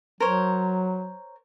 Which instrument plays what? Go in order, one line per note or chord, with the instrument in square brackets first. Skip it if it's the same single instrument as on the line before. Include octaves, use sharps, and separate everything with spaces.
[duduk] F#3 [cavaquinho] A#4 C5 C#5